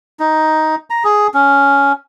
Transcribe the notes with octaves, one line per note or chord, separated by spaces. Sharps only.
D#4
A#5
G#4
C#4